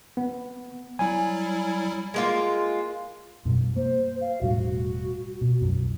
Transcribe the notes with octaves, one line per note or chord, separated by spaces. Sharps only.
B3
F#3 G3 E4 G#5
G#3 A#3 F4
F#2 B2 G3
A#3 C5
F5
E1 A2 G3 F#4
B2
B1 F#2 F#3